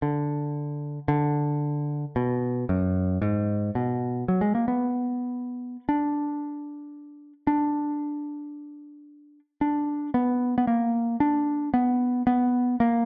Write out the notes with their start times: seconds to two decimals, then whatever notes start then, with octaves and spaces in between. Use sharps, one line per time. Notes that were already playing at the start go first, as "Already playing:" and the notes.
0.02 D3
1.08 D3
2.16 B2
2.69 F#2
3.22 G#2
3.75 B2
4.28 F#3
4.41 G#3
4.55 A#3
4.68 B3
5.89 D4
7.47 D4
9.61 D4
10.14 B3
10.58 B3
10.67 A#3
11.20 D4
11.74 B3
12.27 B3
12.80 A#3